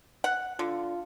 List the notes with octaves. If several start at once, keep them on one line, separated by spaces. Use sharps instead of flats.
F#5
D3 F4